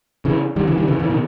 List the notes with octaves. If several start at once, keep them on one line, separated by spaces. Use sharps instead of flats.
C#3 E3
D#3 G3
C#3 E3
D#3 G3
C#3 E3
C#3 E3
B2 D#3